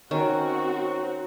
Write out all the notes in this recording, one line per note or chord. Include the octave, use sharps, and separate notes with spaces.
D#3 C4 C#4 F#4 A#5